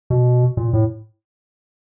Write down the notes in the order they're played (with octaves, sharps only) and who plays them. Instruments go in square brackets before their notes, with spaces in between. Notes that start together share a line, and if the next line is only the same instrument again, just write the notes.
[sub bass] B2
A#2
A2